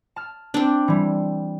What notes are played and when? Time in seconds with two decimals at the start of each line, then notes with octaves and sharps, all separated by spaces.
0.16 A5 F6
0.54 C4 D4
0.88 E3 G3